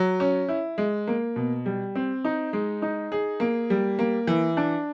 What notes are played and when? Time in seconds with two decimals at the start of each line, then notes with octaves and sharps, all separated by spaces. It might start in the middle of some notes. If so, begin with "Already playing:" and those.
Already playing: F#3
0.20 C#4
0.49 E4
0.78 G#3
1.08 A#3
1.36 B2
1.66 G3
1.95 C4
2.25 D#4
2.53 G#3
2.82 D#4
3.12 G#4
3.40 A#3
3.70 G3
3.99 A#3
4.27 E3
4.57 D4